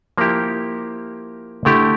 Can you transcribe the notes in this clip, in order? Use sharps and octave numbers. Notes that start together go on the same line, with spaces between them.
F3 A#3 E4 G4
D3 A3 E4 G4